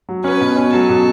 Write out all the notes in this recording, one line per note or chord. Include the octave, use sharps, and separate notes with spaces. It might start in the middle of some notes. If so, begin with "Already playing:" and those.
F#3
C#4 B4
B2
C#4
F#3 A4
B2